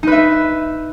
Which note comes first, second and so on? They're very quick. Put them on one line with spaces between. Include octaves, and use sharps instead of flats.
D#4 B4 E5